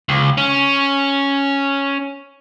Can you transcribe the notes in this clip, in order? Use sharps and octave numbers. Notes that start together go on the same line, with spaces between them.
C#2
C#4